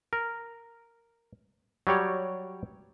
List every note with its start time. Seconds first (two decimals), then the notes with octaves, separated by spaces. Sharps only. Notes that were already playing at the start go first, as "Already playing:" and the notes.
0.13 A#4
1.87 F#3 G3 G4 C#5 D5